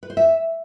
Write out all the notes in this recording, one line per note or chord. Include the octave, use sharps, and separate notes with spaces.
B4
C5
E5